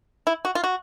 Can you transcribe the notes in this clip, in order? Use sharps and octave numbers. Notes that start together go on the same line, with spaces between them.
E4
F#4
F4
F#4